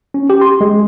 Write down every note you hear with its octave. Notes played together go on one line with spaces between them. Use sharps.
C#4
G4
C6
G#3